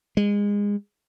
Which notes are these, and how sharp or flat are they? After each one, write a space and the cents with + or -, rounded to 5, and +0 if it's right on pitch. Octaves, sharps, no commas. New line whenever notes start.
G#3 -25